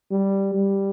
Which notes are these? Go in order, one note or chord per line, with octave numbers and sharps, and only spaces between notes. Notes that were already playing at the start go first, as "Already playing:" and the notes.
G3
G3